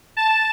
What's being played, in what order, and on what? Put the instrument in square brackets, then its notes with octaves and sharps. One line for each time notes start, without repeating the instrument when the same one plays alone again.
[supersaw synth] A5